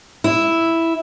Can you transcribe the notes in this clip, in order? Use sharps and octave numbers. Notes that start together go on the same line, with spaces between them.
E4